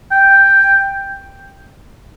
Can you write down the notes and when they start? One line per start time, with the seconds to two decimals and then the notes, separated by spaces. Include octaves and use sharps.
0.11 G5